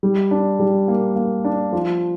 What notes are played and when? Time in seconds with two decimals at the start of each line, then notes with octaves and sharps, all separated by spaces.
0.03 G3
0.31 D4
0.60 G3
0.88 A#3
1.16 A#3
1.45 D4
1.73 F3